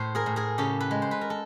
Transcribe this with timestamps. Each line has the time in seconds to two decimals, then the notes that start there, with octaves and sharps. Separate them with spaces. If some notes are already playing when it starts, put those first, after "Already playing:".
Already playing: A2 C5
0.15 G#4 A#4
0.26 A2
0.36 G#4 A#4
0.58 C#3 G4 A4
0.80 A4 B4
0.91 G#3
1.02 C5
1.11 B4
1.21 A#4
1.30 A4